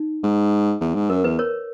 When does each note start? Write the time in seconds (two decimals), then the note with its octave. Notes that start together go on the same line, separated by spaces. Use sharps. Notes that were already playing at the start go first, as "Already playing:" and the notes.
Already playing: D#4
0.23 G#2
0.81 E2
0.95 G#2
1.10 F#2 A#4
1.24 E2 B4
1.39 A#4 C#5